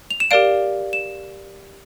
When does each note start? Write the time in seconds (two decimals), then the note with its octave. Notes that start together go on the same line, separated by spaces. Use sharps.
0.10 F7
0.20 E7
0.31 G4 A#4 D5 F5 D7
0.93 E7